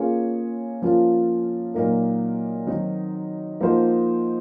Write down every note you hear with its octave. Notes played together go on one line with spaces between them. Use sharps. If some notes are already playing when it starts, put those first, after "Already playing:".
Already playing: A#3 C#4 F4 G#4 C#5
F3 A#3 C#4 F4
A#2 F#3 A#3 D#4 A#4
D#3 F#3 C4 D#4
F3 A#3 D#4 F#4 C5